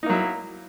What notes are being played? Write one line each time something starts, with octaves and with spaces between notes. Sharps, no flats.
F#3 A#3 D#4 E4